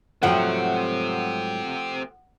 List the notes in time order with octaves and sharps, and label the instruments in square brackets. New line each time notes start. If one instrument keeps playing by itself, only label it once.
[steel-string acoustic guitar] G#2 F#3 G5 [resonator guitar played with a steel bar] F3 A3 [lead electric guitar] C4 G4 [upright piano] F#5